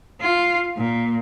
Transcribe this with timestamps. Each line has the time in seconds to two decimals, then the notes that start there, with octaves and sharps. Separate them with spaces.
0.21 F4
0.77 A#2